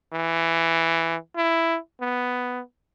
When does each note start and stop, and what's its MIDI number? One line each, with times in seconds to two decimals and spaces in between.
0.13 1.16 52
1.36 1.77 64
2.01 2.60 59